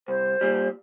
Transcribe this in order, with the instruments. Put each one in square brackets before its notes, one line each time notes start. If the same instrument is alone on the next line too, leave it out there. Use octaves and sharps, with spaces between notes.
[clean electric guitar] C2 [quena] C5
[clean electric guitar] A#2 G3